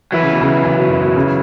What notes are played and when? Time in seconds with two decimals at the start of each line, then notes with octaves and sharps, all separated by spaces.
0.12 E3 F#3 E4 B4
0.23 C#3
0.31 B2
0.41 C#3
0.64 C#3
0.78 B2
0.89 F#2
1.02 B2
1.16 C#3